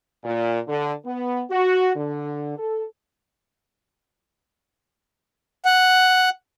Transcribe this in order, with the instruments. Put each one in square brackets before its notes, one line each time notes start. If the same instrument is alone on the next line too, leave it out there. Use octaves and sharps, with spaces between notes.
[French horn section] A#2
D3
B3
F#4
D3
A4
[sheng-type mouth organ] F#5